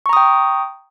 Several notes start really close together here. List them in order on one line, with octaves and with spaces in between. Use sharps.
C#6 A#5 D#6 G5